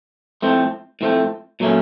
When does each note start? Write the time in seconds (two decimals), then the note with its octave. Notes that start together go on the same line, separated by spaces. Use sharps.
0.42 A2 F3 A3 C4
1.01 A2 F3 A3 C4
1.60 A#2 F#3 A3 C#4